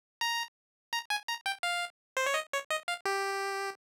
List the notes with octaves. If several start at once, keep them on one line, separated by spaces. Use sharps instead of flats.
A#5
A#5
G#5
A#5
G5
F5
C5
C#5
D#5
C#5
D#5
F5
G4